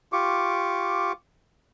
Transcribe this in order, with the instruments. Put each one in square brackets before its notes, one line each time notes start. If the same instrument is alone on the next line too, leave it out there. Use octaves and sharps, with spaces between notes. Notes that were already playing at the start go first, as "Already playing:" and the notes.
[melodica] F4 G4 C#6 D6